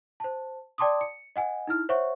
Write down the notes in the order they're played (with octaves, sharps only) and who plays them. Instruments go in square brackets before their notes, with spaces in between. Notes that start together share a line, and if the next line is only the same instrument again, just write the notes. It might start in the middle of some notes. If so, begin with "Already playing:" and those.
[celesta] C5 A5
D5 G5 A5 C6 D6 D#6
C#7
D#5 F#5 G#5
D#4 E4 F6
C5 C#5 E5 F#5 C#6